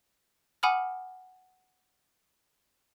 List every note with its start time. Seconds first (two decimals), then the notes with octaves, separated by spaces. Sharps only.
0.63 F#5 G#5 B5 D6 D#6 F6